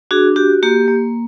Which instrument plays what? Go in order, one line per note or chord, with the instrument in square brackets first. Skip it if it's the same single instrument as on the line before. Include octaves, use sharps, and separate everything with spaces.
[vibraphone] D4 F#4 G#4
F#4 G4
A#3 G4
A#3